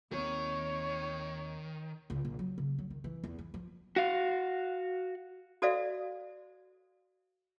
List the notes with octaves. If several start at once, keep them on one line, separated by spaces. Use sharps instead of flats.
D#2 D#3 C4 C#5
C#2
A#1
F#3
C#3
F#3
D#3
E3
E2
E3
F3
F#4 F5
F#4 A4 C5 D5 E5 F5